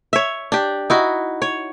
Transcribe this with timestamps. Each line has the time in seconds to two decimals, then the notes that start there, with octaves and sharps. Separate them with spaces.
0.13 C#5 E5
0.52 D4 G4
0.90 D#4 E4 F#4
1.42 C#5